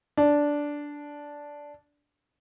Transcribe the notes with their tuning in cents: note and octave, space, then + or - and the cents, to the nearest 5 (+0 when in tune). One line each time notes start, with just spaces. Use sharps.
D4 -10